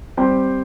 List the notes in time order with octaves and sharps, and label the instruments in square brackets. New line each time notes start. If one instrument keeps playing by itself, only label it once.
[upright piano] G3 C4 G4 C5